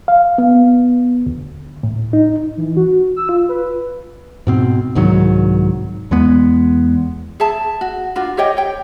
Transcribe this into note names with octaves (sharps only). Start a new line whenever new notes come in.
F5
B3
D2
A2
D#4
E3
F#4
E6
F4
B4
G#2 B2 C4
C2 G#2 D#3 F#3
E2 G#3 B3
G#4 E5 A5
F#4
D4 F4 F#4
G4 C#5 D#5 G5
C#5 G5